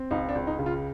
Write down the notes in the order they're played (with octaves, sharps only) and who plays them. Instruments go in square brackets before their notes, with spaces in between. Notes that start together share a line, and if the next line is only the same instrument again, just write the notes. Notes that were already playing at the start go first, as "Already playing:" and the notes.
Already playing: [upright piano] C4
C#2 D#4
D4
C#2
D#4
C#3
F4